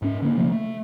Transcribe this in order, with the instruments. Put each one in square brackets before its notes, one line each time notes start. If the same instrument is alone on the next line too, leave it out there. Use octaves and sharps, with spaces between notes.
[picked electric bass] G#2 C#4
D3 A#3
C3 F3 A3 A#3
A3